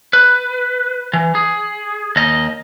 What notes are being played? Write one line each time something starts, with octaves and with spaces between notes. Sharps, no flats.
B4
E3
G#4
D#2 D#5